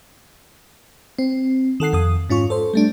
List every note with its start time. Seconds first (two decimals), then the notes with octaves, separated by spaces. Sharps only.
1.18 C4
1.80 D#3 A4 F#5 C7
1.93 F2 A4 D#6
2.30 G#2 C#4 F4 C#6
2.50 A4 C5
2.74 G3 A3 D4